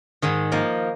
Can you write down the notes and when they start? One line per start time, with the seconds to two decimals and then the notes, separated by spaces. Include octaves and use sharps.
0.22 G#2 D#3 G#3
0.52 F3 A#3 D#4